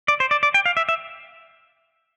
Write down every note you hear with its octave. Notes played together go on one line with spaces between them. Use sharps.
D5
C5
D5
D5
G5
F5
E5
E5